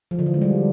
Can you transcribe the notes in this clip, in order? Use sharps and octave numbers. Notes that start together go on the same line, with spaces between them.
F3
D3
E3
G#3
G3